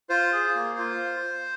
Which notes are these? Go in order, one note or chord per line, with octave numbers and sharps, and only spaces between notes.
F4 C5
G#4
A#3
F4